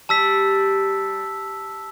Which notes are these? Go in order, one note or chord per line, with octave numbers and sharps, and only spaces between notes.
G3 A5 E6 B6